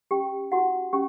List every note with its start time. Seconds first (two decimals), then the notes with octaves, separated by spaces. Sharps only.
0.11 C#4 G4 G5
0.52 E4 F#4 G4 F#5
0.93 C#4 G4